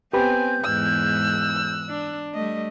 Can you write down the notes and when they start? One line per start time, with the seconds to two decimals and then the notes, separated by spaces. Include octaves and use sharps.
0.13 B3 C4 G4 B4 G#5 G6
0.64 E2 G#2 E6 F#6
1.90 D4
2.35 G3 A3 D#5